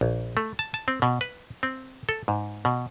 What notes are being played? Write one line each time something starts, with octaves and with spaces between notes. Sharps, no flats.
A#1
A3
A5
A5
C4
B2
B4
C4
A4
G#2
B2